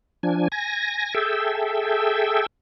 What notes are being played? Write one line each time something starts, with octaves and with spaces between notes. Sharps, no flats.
F3 D4 G#5
G#5 A#6
G#4 A4 E5 G5